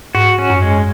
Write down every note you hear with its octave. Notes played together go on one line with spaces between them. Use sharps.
G#2 F#4
C#4
F#2
G#3